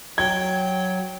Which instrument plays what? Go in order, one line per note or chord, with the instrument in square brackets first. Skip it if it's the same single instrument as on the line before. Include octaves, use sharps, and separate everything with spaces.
[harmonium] F#3 [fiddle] G5 [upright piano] G#6